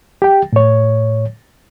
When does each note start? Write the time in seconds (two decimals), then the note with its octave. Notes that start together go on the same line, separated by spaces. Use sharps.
0.22 G4 G5
0.53 A2 C#5